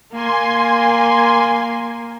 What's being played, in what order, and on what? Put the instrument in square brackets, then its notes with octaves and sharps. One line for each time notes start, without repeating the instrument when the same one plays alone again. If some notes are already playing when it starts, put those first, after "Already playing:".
[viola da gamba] A#3 [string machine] G#5 C6